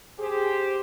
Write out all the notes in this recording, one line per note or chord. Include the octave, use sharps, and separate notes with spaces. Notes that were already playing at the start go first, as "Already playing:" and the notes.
G4 G#4 C5